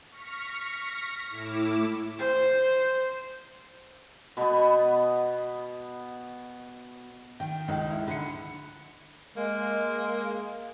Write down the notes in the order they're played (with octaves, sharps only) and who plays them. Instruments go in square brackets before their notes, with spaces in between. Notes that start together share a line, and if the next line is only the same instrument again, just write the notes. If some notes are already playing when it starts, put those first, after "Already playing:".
[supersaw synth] C#6 F6 A#6 B6 C#7
A2 E4 D6 E7
[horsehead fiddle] C5
[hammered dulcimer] B2 B3
[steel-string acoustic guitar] D#3 [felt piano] G5
[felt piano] C#2 D#4
E4
[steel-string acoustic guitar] D3 [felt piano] B5 C#7
[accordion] G#3 [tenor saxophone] A#3